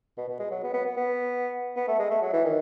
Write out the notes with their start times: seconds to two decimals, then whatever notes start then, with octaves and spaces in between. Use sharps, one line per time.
0.18 B2
0.29 B2
0.39 G#3
0.51 F#3
0.63 B3
0.74 B3
0.86 B3
0.97 B3
1.76 B3
1.88 A3
1.99 G#3
2.11 A3
2.22 F#3
2.33 E3
2.45 D#3